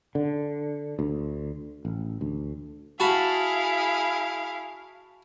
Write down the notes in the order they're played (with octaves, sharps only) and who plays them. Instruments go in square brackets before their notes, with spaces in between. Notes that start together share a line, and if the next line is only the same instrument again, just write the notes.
[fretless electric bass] D3
D2
A1
D2
[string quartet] E4 G#4 F5 [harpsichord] F#4 A5 B5